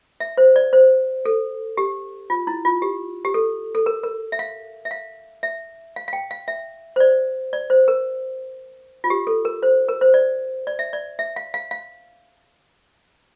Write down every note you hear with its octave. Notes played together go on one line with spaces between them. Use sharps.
E5
C5
D5
C5
A4
G4
F4
E4
F4
G4
G4
A4
A4
A#4
A#4
E5
F5
E5
F5
E5
F5
F5
G5
F5
E5
C5
D5
D5
C5
A#4
F4
G4
A4
A#4
C5
A#4
C5
D5
D5
E5
D5
E5
F5
F5
F5